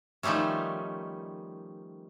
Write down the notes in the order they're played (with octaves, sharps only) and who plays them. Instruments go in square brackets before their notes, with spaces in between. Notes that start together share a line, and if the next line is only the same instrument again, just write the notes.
[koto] D#3 F3 G3 A3 C#4